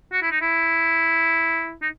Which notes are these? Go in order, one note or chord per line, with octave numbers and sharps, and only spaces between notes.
F#4
E4
D#4
E4
D#4